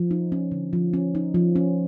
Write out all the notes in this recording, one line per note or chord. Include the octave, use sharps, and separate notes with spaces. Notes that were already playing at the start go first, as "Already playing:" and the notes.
Already playing: F3
D#4
C#4
D3
F3
C#4
D#4
F3
C#4